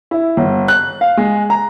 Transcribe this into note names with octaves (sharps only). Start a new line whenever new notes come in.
E4
G1
F#6
F5
G#3
A#5